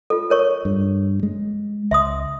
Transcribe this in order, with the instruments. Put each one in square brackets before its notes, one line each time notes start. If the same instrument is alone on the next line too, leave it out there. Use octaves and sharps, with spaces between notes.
[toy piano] F4 A4
A#4 C#5 C#6
[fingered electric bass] G2
G#3
[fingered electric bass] C#2 [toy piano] E5 C6 D#6